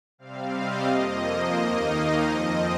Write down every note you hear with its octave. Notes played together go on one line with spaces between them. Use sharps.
C3 G3 C4 F5
D#5
F2 F3 A#3
C5
D#2 D#3 A#3 D#4 D#5
F5
F2 F3 C4 D#5